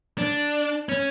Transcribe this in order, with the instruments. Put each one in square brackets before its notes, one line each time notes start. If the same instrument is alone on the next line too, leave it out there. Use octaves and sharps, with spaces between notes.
[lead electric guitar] D4
C#4